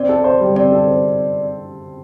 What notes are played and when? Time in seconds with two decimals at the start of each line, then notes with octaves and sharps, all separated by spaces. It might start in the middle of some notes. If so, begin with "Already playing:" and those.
Already playing: C4 D5
0.09 A4
0.24 C5
0.40 G3
0.55 C4 D5
0.72 A4
0.87 C5